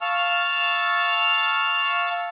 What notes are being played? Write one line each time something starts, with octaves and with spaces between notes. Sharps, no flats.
F5 A5 C#6 E6 F6